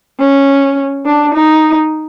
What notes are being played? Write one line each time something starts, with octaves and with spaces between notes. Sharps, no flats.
C#4
D4
D#4